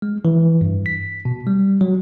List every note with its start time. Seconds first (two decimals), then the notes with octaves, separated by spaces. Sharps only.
0.02 G#3
0.25 E3
0.61 G2
0.86 B6
1.25 B2
1.47 G3
1.81 F#3